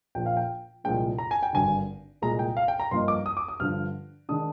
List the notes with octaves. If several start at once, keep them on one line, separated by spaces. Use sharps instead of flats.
A#1 A#2 F3 G5
F5
G5
C2 A#2 F3 G#3 D4 G5
A#5
G#5
G5
G#1 G2 D3 G#5
C2 A#2 G#3 A#5
G5
F5
G5
A#5
G2 F3 A#3 D#4 C6
D6
D#6
D6
D#6
G2 D3 F3 F6
D#3 G#3 D4 D#6